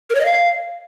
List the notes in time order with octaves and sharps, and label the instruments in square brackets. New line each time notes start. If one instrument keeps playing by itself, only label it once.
[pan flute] A#4
C#5
D#5
F5